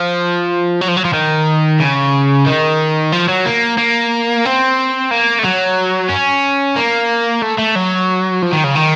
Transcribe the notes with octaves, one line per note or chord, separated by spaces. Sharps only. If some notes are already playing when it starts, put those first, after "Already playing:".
Already playing: F3
F#3
F3
F#3
F3
D#3
C#3
D#3
F3
F#3
A#3
A#3
C4
A#3
A3
F#3
C#4
A#3
A3
A3
F#3
F3
D#3
C#3
D#3